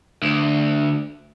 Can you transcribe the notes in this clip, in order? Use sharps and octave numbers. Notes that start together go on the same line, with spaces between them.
D2